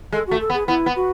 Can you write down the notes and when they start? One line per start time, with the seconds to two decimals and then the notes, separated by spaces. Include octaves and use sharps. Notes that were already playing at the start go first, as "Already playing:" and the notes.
0.12 G#3 A4
0.27 A3 F#4
0.40 A4
0.50 B3
0.54 G#4
0.68 B3 E4
0.86 B3
0.96 F#4